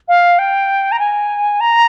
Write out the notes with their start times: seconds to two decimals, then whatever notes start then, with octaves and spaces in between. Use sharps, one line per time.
0.08 F5
0.39 G5
0.92 A#5
0.99 G#5
1.60 A#5